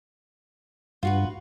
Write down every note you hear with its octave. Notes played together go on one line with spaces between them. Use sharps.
G2 F4 F#4 B4